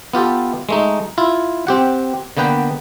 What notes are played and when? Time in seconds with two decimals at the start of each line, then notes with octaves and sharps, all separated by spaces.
0.14 B3 F4 G4 A4
0.69 G#3 A3 D#4
1.18 E4 F4
1.67 C4 G4 F#5
2.37 D3 A#3 B3 B4 G5